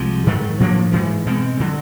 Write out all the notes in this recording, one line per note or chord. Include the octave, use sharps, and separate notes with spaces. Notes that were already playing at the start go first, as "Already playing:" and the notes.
Already playing: C2 C3 F3 G#3
G#2 D#3 F#3 A3
A2 F3 A#3 D4
G#2 E3 G#3
B2 G#3 C4
D3 F#3